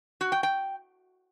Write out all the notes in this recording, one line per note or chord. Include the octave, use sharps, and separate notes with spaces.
F#4
G5
G5